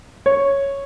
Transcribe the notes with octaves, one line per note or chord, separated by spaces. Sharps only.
C#5